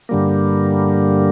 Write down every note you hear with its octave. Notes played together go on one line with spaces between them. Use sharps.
G2 D3 G3 A#3